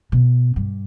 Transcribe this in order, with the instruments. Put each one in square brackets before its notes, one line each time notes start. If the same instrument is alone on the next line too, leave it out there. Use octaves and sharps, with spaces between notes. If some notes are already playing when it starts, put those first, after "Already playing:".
[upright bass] B2
G2